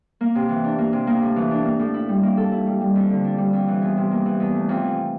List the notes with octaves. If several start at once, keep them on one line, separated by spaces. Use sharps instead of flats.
A#3
C3
E3
D4
A#3
C3
A#3
A2
E3
D4
A#3
A2
E4
G3
A#3
A4
E4
G3
G3
F2
D3
D4
G3
F2
E3
E2
C3
A#3
E3
E2
A3
F2
E3